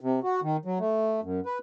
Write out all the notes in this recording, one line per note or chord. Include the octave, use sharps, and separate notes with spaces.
C3
F#4
D#3
F#3
A3
F#2
B4